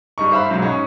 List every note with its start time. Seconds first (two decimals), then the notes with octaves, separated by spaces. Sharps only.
0.18 G2 D#4 C#6
0.32 C5 E5 F5 B5 F#6
0.51 B1 G#2 F#3
0.62 C#4 D#4